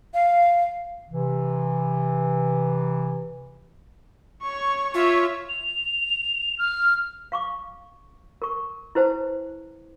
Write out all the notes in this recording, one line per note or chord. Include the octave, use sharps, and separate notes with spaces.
F5
C3 E3
C#5 C#6
F4 C#5 E5
F7
F6
F5 C#6 D6
A#4 C#6
E4 B4 C5 F#5 A5